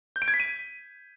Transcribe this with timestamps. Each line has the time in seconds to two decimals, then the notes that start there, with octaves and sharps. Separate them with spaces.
0.16 G6
0.22 D7
0.28 G#6
0.34 B6
0.40 D#7